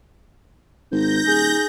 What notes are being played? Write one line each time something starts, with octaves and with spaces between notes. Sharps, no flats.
G#1 D#4 G6 A#6
D#1 G#4